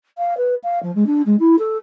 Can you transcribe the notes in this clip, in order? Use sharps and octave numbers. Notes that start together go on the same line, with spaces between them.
F5
B4
F5
F3
G#3
D4
G#3
E4
A4